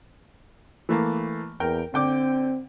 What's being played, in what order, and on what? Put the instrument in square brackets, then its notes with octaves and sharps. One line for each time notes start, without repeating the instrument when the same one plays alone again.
[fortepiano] E3 A3 A#3
[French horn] E2 [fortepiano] A#4 G5
[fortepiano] D3 G5 D6 [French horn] C4